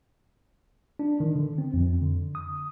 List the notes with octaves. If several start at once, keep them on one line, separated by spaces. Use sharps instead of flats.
D4
D#3
D3
C4
F2
D3
D#6